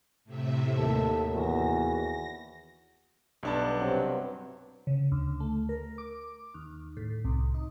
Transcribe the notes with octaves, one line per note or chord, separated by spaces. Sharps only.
A2 C3 E5
D#2 A4
E2 F#4 A#6
B1 G2 B3 D4 A5
C3 F#3 C4
C#3
D2
A3
A#4
D6
D#2
A2
C2
D#4